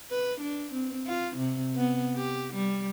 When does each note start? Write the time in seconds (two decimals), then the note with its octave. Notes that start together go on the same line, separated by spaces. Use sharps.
0.10 B4
0.41 D4
0.73 C4
1.07 F4
1.37 C3
1.76 B3
2.15 G4
2.54 G3